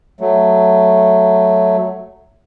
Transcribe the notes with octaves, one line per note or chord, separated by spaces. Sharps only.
F#3 A3